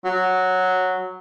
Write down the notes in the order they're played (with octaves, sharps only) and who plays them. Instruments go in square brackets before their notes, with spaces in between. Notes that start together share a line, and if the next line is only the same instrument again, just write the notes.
[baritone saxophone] F#3